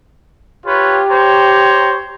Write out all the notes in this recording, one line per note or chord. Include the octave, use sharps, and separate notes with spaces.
F4 G4 B4 C#5
C5 C#5 A#5